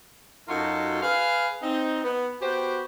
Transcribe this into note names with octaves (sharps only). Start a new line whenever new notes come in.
F#2 D#4 F4 F#4 A4
G#4 B4 F5
C4 D#4
B3
B3 F#4 G4 C5 G5